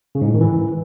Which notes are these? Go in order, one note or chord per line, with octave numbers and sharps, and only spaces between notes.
C#3
G#2
A2
D#3
E3